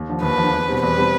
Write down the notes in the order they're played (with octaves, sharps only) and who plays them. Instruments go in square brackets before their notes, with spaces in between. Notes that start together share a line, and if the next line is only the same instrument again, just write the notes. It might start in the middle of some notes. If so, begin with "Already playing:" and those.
Already playing: [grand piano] D#2
D3 F3
[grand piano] D#2 [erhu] B4
[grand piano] F3
D3
E2
B2 G3 C4
[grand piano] E2 [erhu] B4
[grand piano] B2 G3 C4